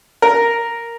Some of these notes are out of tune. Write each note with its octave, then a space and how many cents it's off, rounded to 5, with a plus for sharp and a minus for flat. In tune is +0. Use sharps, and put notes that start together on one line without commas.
A#4 -5